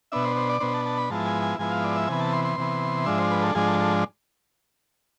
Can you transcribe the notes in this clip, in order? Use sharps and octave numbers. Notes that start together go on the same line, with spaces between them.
B2 B3 D4 E5
C5
C5
D5
B2 B3 D4 C5
A5
A5
B5
G#2 F3 G#3 B3 E4 A5
G#5
G#5
G#2 F3 G#3 B3 E4 G#5
F5
D5
E5
C3 E3 B3 G#5
A5
C6
C6
C3 E3 B3
G#2 F3 G#3 D4 E5
C5
B4
A4
G#2 F3 G#3 D4 G#4
A4
A4